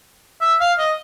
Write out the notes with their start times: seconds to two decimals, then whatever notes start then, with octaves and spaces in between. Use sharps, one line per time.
0.41 E5
0.60 F5
0.78 D#5